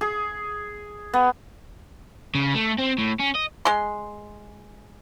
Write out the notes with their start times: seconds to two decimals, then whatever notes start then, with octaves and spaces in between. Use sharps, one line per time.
0.01 G#4
1.14 B3
2.35 C#3
2.55 A3
2.79 C4
2.99 A2
3.20 C#4
3.35 D#5
3.65 G#3 C6